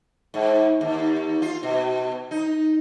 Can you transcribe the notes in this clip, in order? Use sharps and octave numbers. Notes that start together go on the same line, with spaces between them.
G#2
D#2
F4
B2
D#4